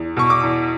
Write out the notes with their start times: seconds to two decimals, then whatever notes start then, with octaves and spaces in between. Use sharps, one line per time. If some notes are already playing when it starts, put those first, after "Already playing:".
Already playing: E2
0.17 B2 C#6
0.30 D6
0.43 E2